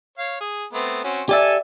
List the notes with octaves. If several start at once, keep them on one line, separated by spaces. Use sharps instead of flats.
C#5 F5
G#4
A3 B3 C4
C4 C#4 F#4
G4 A4 D5 E5 G#5